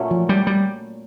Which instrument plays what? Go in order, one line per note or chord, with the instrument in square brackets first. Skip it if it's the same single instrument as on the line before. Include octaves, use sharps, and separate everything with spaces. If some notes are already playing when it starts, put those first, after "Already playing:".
Already playing: [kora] A#2 F#3 A3 C#4
[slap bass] F3
G3
G3